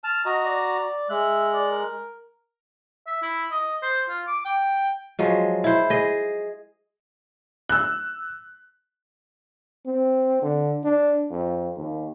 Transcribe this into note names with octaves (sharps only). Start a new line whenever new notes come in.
A5 F6
F#4 D#5 A#5
D5
G#3 E5 F#6
D5
A#4
E5
E4
D#5
C5
F4
D6
G5
F3 F#3 G#3
E4 C5
G#4 D#5
E6 F#6
C4
D3
D4
F2
D#2